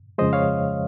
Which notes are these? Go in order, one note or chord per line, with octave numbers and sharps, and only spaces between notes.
F2 C#3 F3 G#3 C5 D#5
C#5 F5